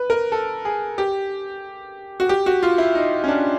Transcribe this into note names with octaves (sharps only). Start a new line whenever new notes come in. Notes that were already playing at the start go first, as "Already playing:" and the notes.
Already playing: B4
A#4
A4
G#4
G4
F#4
G4
F#4
F4
E4
D#4
C#4
D4